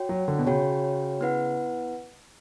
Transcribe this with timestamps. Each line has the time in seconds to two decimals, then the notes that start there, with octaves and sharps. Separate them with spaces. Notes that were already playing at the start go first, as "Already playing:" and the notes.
Already playing: F#4 C#5 G5
0.09 F#3
0.28 D3
0.39 B2
0.47 C#3 F#4 C#5 G5
1.21 B3 E4 B4 F#5